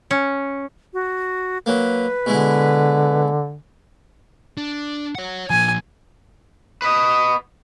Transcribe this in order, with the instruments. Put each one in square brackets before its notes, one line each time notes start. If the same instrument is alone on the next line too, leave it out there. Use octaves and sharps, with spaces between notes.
[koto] C#4
[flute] F#4
[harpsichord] F#3 A#3 [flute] B4
[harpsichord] B2 G#3 E4 [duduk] D3
[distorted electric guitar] D4
C#5 F#5
[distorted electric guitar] A#2 F3 [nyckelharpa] G#5
[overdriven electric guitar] B4 D#5